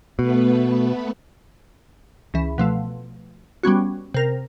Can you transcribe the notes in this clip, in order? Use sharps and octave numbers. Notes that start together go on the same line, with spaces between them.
B2 A3 B3 B4
C#2 E3
B2 F3 A3
G3 B3 C#4 F#4
C3 A#4